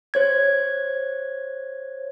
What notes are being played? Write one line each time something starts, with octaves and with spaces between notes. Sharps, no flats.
C5 C#5 G#6